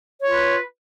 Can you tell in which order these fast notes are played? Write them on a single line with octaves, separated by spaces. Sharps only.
C#5 F4 B4